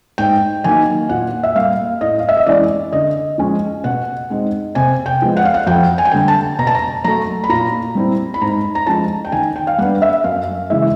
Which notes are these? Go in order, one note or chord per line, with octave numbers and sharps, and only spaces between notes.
G#2 G5
D#3 F#3 A#3 D#4 G#5
A#2 F#5
E5
G3 A#3 F5
A2 D#5
F5
E5
D#5
E3 G#3 C#4 E4 D5
D3 D#5
F3 G#3 C#4
B2 F#5
G#3 C4 D#4
C3 G#5
G5
F3 G#3 B3
F#5
F5
F#5
F2 G5
G#5
G5
D3 G3 G#5
A5
B2 A#5
A5
A#5
F#3 A3 A#5
B5
A#2 A#5
G3 C4 E4
B5
G#2 A#5
A#5
F3 G#3 C#4 A5
G5
D#3 G#5
G5
F5
G3 B3 D4 F#5
E5
F#2 F5
C#3 E3 G#3 E5